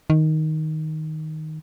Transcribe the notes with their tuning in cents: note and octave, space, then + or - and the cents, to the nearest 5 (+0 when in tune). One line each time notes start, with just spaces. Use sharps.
D#3 +5